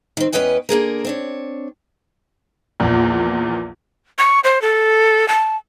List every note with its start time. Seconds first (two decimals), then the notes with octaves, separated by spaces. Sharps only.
0.17 D#3 C4
0.32 E2 C#4 B4 D#5 G5 G#5
0.69 D3 A#3 G#4 A#4
1.05 C4 D4 C#5
2.80 A#1 E2 A#2
4.18 C#6
4.44 C5
4.62 A4
5.28 A5